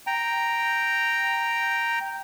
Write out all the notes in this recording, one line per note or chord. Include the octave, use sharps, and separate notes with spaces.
G5 A#5